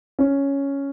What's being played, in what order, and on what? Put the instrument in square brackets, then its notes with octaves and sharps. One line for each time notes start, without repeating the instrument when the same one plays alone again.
[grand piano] C#4